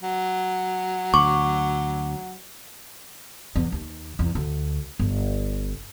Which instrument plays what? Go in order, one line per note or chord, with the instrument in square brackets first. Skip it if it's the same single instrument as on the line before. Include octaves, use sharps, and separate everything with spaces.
[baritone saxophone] F#3
[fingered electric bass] D2 [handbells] C#6 [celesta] D6
[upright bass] E2
D#2
E2
D2
G1